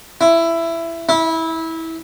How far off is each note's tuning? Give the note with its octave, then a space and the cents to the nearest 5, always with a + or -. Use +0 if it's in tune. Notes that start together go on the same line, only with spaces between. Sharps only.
E4 +15
E4 -20